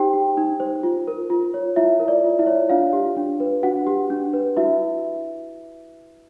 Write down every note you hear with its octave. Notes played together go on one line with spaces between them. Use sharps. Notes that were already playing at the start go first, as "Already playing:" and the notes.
Already playing: D#4 G4 C5 G5
G4
D#4
C5
F4
A#4
F4
C#5
E4 F4 E5
A#4
D5
F4
E4 E5
C#5
D4 F4 F5
G4
D4
B4
D4 F#4 F#5
G4
D4
B4
E4 F#4 E5